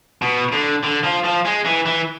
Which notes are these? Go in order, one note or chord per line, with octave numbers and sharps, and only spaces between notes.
B2
D3
D3
F3
F3
G#3
E3
E3